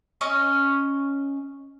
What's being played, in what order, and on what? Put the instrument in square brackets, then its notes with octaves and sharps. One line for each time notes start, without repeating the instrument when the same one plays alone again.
[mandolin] C#4 D#5 C#6